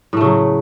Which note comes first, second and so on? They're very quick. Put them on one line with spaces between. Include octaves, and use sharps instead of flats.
A2 A3 C#3 F#3